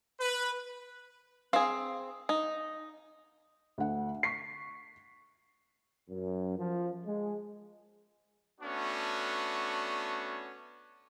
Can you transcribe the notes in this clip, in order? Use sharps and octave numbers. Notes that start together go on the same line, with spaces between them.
B4
C4 G#4 F5
D#4
D2 F#5
C#6 B6 C7
F#2
F3
G#3
A3 B3 C#4 D4 F#4